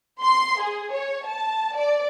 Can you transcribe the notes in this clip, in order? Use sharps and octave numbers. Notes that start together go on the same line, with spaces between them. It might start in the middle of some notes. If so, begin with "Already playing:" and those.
C6
G#4
C#5
A5
D5